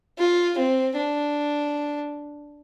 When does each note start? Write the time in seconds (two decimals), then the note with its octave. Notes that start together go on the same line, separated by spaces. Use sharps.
0.18 F4
0.57 C4
0.95 D4